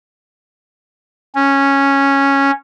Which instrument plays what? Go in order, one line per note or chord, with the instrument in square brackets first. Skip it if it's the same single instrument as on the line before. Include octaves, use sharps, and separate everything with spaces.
[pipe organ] C#4